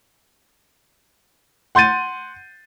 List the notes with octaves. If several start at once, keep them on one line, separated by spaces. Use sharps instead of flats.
F#5 C6 G6 A6 D#7